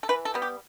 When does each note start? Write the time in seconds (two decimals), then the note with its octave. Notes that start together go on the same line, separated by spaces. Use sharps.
0.03 A4
0.09 E3 B4
0.25 A4
0.34 G3 B3
0.42 G4